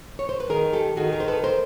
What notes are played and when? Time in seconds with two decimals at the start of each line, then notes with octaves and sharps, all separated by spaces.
0.19 C#5
0.29 C5
0.40 B4
0.50 D#3 G#4 A#4
0.73 G4 A4
0.96 D#3 F#4 G#4
1.13 G#4 A#4
1.20 C5
1.28 A4 B4
1.43 A#4 C5